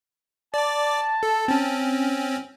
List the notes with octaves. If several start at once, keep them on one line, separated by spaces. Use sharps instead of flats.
D5 A5 D6
A4
C4 C#4